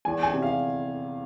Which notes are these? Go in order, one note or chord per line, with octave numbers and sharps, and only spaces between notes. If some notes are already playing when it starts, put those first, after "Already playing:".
E2 G#5
G#5
C3
F5